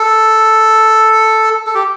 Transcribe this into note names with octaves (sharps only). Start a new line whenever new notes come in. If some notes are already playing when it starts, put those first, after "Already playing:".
Already playing: A4
A4
G4